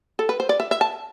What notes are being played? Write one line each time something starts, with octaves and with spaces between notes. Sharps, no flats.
A4
B4
C5
D5
E5
E5
A5